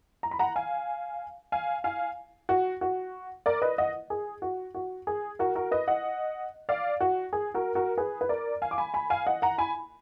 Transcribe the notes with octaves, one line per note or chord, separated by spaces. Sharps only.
A#5
B5
F#5 A#5
F5 G#5
F5 G#5
F5 G#5
F#4
F#4
A#4 D5
B4 D#5
D#5 F#5
G#4
F#4
F#4
G#4
F#4 A#4
F#4 A#4
B4 D#5
D#5 F#5
D5 F5
F#4
G#4
F#4 A#4
F#4 A#4
G#4 B4
B4
A#4 D5
F5 G#5
D6
G#5 B5
G#5 B5
F5 G#5
D#5 F#5
F#5 A#5
G#5 B5